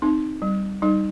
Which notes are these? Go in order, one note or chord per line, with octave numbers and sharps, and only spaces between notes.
C4 D#4
G3
G3 D#4